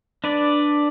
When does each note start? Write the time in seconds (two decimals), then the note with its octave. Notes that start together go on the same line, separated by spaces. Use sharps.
0.24 D4 B4 D5